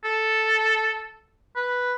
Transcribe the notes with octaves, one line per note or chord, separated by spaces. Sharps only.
A4
B4